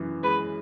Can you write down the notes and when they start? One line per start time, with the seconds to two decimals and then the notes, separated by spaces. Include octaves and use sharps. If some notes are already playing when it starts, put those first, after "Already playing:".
Already playing: F#2 E3
0.23 G#3 B4